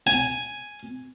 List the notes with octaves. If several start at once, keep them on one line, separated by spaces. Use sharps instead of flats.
G#5